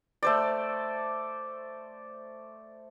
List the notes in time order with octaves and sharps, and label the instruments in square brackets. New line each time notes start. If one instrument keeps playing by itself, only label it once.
[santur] A3 C5 D5